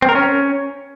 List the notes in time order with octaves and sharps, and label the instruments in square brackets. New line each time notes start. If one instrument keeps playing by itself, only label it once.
[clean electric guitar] C4
A#4
C#4